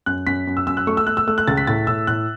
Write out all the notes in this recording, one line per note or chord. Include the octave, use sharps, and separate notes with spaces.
F#2 F#6
F#2 B6
F#2
E6
F#2 E6
F#6
A3 C#6
E6
A3 F#6
E6
A3 E6
F#6
C#2 A6
B6
A2 A6
A2 E6
A2 F#6